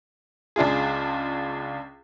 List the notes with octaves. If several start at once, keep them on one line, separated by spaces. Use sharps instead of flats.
C#2 D4 F4 G#4